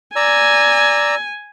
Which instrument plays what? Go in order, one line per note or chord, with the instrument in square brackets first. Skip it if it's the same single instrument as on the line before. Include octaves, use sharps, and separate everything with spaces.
[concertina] D5 A#5 E6 [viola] G#5